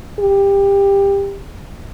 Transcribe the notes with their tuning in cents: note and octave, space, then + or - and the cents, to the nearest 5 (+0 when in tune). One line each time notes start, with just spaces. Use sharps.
G4 +20